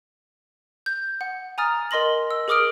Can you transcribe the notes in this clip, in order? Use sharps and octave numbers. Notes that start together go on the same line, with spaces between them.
G6
F#5
G#5 A#5 D#6 F6 A6
A#4 D#5 C6 A#6 F#7
E6
G#4 A#4 D6 D#6 F6 D7